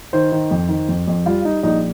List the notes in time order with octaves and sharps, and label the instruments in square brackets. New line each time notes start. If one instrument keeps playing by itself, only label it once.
[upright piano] D#3 C5
D#3
F2
D#3
F2
F2
G3 F4
G3 D#4
A#1 D#4